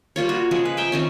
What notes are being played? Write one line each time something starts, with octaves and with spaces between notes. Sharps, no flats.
G3 A#3 F4 C#5
F#4
C#3 F3 G#3 G#4
B4
E5 G5 G#5 A#5
D#3 C4 C#4